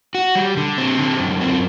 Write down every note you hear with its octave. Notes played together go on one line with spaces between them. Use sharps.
F#4
G3
D3
C4
D3
F#2
C4